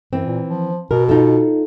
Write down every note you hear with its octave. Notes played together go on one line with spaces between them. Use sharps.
F#2 E3 C4
A#2
F3
B2 A#4
D#4 F4 A4